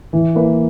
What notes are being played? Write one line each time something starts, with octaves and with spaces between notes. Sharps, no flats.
E3
A#3 E4 B4